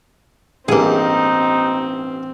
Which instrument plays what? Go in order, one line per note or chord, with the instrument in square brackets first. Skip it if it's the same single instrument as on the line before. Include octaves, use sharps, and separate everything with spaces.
[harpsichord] A1 G2 [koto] A#3 G#4 [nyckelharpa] C4 [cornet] D#4